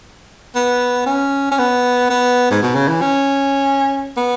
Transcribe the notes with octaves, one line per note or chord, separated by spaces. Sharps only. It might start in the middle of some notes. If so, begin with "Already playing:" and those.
B3
C#4
C#4
B3
B3
G#2
B2
C#3
E3
C#4
B3